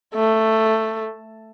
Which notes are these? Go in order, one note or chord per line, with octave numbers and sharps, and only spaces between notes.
A3